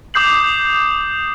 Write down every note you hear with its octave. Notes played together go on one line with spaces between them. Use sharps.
D6 D#6 G6 C7 F#7